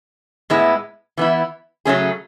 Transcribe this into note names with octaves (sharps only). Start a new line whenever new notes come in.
A2 G#3 B3 E4
E3 B3 E4
C#3 F#3 A3 C#4 G#4